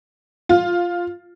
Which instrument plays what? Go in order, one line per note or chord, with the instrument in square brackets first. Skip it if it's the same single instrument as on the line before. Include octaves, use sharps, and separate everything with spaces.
[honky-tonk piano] F4